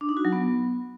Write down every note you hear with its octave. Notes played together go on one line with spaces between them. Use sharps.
D4
D#4
F#4
F#3
B3